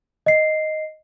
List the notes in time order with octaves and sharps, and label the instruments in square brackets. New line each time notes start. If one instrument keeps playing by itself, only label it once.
[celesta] D#5 C7